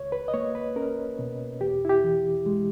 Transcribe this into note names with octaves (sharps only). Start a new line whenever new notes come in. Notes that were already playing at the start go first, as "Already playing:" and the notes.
Already playing: C#2 C#5
B4
D#5
A#3 C#5
B4
C#4 A#4
B2
E2 G4
E4
G4
E3
G#3